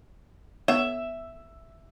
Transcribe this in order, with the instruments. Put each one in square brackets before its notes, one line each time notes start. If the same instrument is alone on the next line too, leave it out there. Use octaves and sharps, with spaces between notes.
[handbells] B3 C#5 [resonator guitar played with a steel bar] E5